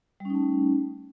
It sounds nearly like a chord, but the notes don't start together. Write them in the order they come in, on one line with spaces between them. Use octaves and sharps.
G3 C#4 D#4 A3